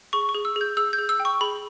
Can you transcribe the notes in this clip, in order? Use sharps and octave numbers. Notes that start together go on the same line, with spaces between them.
G#4 C#6
C#6
G#4
E6
G#4 G6
G#4 E6
G6
G#4
E6
G5
C#6
G#4 B5